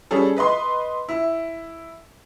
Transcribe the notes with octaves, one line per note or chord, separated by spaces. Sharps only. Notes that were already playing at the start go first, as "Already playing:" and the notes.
G3 C#4 G#4 A4
B4 D#5 B5 C6
E4